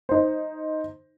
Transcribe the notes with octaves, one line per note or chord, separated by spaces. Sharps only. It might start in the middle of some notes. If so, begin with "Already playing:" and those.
D#4 C5